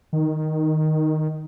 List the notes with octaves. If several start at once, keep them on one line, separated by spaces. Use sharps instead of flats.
D#3